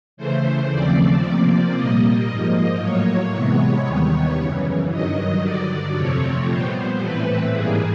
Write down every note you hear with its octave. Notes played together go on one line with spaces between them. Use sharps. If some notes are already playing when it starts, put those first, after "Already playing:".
C#3 E3 A3 C5
D#2 C#3 F3 A3 C4 D5
C3 F3 A#3
A#2 G3 A#3 D#5
G#2 F3 A#3
A2 F#3 A#3 C#5
C3 E3 G#3 B3
D#2 D#3 G3 B3 C#5
F#2 C#3 E3
G2 D#3 F#3 D#5
G2 D3 F#3 D5
F2 C3 F3 A3 C4 C#5
A#2 G3 B3 C5
A2 E3 A3 C4 B4
G#2 E3 G3 A#3 G#4